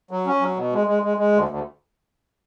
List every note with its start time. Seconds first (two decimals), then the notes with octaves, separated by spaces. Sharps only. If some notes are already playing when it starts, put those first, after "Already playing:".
0.11 F#3
0.27 C#4
0.41 F#3
0.56 B2
0.73 G#3
0.87 G#3
1.03 G#3
1.18 G#3
1.32 D2
1.48 D2